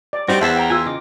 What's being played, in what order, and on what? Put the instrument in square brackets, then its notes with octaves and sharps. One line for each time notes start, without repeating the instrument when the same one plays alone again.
[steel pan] D5
[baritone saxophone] G3 [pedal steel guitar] C4 D#4 F#4 [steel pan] C5
[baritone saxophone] E2 [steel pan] E5 A5 [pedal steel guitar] F#5
[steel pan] G5 A#5
[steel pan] F4 [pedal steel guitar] G#5 E6
[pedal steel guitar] C#3 D#5 D6